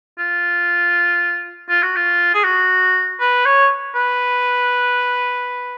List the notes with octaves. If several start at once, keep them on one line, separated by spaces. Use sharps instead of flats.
F4
F4
F#4
F4
G#4
F#4
B4
C#5
B4